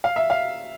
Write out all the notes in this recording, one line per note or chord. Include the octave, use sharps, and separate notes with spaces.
F5
E5
F5